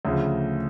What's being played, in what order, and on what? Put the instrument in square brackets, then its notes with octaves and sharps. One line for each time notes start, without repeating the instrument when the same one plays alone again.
[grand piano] D2 C#3 F3